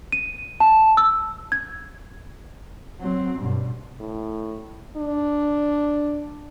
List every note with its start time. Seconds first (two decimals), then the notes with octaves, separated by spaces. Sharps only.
0.12 D#7
0.60 A5
0.97 E6
1.52 G#6
3.00 F#3 C4
3.39 G2 B2
4.00 A2
4.97 D4